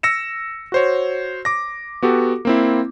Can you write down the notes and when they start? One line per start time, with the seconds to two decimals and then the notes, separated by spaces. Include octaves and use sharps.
0.03 E6 A#6 C#7 E7
0.72 F#4 C5 C#5
1.45 D6 A#6
2.02 B3 F#4 G4 A4
2.45 A#3 C4 E4